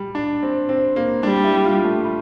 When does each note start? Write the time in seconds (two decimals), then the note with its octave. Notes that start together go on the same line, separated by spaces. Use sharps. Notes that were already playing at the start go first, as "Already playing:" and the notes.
Already playing: G3
0.15 D4
0.43 C4
0.69 C4
0.96 A#3
1.23 G3 D4
1.44 E4
1.64 F4
1.84 A3
2.05 G3